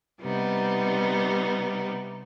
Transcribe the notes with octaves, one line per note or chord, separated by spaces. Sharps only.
C3 G3 B3 D#4